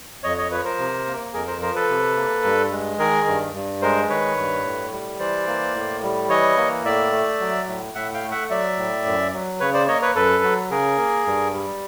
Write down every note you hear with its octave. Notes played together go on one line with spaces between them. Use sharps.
F2 C#5 D#5
C#5 D#5
F3 B4 C#5
A#4 C5
C3
A#3
F2 G#4 A#4
A#4 C5
F3 A#4 C5
A4 B4
C3
A#3
G2
G#3
D#3 G#4 A#4
G2
G2
G#3 A#4 C5
D#3 B4 C#5
G2
A2
G3
E3 C5 D5
A#3
A2
G3
E3 C#5 D#5
A#3
A2 D5 E5
A3
F#3
A2
A2 E5 F#5
F5 G5
A3
E5 F#5
F#3 D5 E5
A2
F#2
F#3
C#3 B4 C#5
C5 D5
A#3 C#5 D#5
B4 C#5
F#2 A4 B4
F#3
C#3 G#4 A#4
A#3
G2
G3